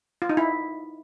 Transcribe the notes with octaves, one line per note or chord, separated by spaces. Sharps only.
F4
D#4
E4